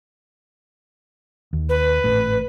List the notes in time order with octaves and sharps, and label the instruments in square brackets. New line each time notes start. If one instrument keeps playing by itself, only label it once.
[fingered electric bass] D#2
[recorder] B4
[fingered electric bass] G#1 A2